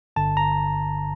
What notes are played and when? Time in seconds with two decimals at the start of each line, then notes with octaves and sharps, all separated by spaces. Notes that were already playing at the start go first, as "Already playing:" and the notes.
0.16 G1 G2 D3 A5
0.37 A#5